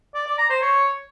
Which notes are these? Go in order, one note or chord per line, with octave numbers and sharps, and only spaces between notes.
D5
D5
A#5
C5
C#5